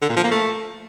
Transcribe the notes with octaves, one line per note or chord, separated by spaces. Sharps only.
D3
A#2
F3
A#3
A3